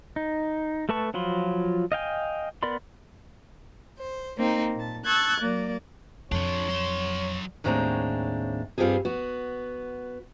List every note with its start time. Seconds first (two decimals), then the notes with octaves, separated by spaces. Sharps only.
0.16 D#4
0.89 A3 A4 B4 A5 C#6
1.14 F3 F#3 F4 B5 C6
1.92 D#5 F5 G5 G#5
2.63 B3 A#4 D5 B5 C6
3.98 C5
4.37 A#3 C4 D#4
4.75 A#2 A5
5.05 A5 C#6 E6 F#6 G#6 A6
5.40 F#3 A#3 D5
6.32 F2 D4 F4 C#5
6.68 F#3 C6
7.64 D#2 A2 G#3 C4 D4 A#5
8.78 G2 G3 C4 F4 G4 G#4
9.05 B3 F#4